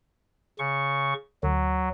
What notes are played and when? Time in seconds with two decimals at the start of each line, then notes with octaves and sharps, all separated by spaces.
0.59 C#3 C#6
1.43 D2 F#3